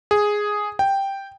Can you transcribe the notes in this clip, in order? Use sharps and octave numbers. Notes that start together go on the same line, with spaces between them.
G#4
G5